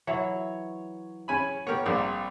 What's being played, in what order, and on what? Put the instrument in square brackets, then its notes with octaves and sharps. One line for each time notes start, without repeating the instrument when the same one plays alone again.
[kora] E3 F#3 E4 [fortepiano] C#5
[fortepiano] C#4 G#5 B5
[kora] B3 G4 [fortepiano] A#4 C#5
[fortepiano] A#1 D5 [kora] G3 A#3 C4